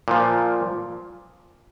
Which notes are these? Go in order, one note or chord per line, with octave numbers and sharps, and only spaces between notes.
A#2 F3